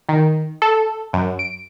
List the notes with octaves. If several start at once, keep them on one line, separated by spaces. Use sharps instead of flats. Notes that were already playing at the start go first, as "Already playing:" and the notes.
D#3
A4
F#2
D7